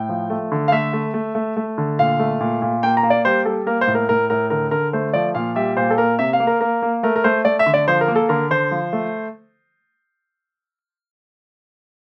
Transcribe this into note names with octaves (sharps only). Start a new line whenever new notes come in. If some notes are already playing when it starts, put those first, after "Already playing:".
Already playing: A2 G5
F3
A3
D3
F5
A3 E5
A3
A3
A3
A3
D3
A#2 F5
A3
A#2
A#2
A#3 G5
A#5
A#3
D5
G3 C5
G3 A4
A#3 A#4
C5
A2
A#4
A2 A#4
A2 A#4
D3 A#4
D3 A#4
A3 C5
F3 D5
A#2 F5
G3 E5
A#2 C5
A4
A#3 A#4
C3 E5
F5
A#3
A#4
A#3 A#4
A#3
A3 A#4
A#4
A3 C5
A3 D5
E5
D3
D5
F3 C5
A#4
A#3
A4
D3 A#4
D3 C5
F3
A3